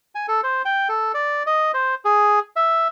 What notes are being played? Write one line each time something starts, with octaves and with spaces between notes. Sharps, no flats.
G#5
A4
C5
G5
A4
D5
D#5
C5
G#4
E5